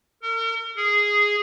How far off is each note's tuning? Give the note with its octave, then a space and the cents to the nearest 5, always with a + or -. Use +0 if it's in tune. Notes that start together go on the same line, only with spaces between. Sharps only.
A#4 -40
G#4 -5